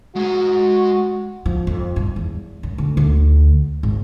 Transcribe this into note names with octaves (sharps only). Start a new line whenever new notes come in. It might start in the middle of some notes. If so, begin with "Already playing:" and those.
G#3 F#4 A#5
F3
F2
G2
E2
F#2
D2
D2
G#1